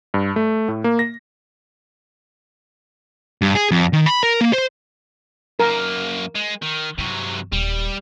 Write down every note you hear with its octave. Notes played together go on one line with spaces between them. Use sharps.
G2
A3
A2
A#3
A#6
G2
G#4
F2
D#3
B5
A#4
A#3
C5
F#2 A#3 A#4
G#3
D#3
G2 C3 F#3
D#1 G3